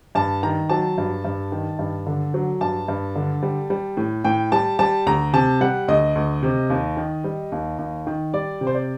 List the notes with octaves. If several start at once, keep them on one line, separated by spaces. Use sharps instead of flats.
G2 A5
D#3 A#5
F#3 A5
G2
G2
D#3
G2
D3
F#3
G2 A5
G2
D3
G3
G3
A2
A2 G5
G3 A5
G3 A5
D2 A#5
C3 A5
G3 F#5
D2 D#5
D2
C3
D#2
D#3
G3
D#2
D#2
D#3
G3 D5
C3
C5
D5